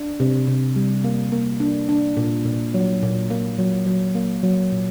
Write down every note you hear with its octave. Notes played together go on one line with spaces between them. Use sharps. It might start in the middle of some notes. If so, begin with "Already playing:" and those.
Already playing: D4
C3
C3
G3
A#3
A#3
D4
D4
A#2
A#2
F#3
A#2
A#3
F#3
F#3
A#3
F#3
A#2